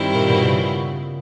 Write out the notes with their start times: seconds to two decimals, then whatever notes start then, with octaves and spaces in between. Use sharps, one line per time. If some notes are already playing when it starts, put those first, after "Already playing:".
Already playing: G2 D#3 G3 C4 E4
0.15 A#2
0.29 B2
0.45 C#3